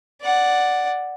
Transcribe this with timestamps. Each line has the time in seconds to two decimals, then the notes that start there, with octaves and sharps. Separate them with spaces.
0.22 D5 F#5